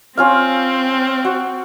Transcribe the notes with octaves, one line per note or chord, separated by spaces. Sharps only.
C4 C#4 F4 F5
F#4